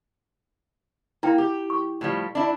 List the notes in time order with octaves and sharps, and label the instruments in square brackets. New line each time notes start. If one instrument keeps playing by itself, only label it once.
[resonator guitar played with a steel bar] A#3 [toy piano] E4 G5
[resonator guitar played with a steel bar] G4
[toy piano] C#6
[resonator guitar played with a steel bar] A2 F3 G3
D4 E4